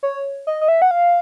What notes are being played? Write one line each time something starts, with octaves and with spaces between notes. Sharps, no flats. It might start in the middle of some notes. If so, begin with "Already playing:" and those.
C#5
D#5
D#5
E5
F#5
F5